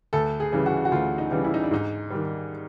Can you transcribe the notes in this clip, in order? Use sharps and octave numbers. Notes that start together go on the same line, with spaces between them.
D2 A4
G#4
C#3 E3 G3
F#4
F#4
D2 F4
D#4
C#3 E3 G3
E4
D#4
D4
G#2 D#4
D#3 G3